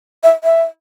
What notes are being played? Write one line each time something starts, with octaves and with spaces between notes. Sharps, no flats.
E5
E5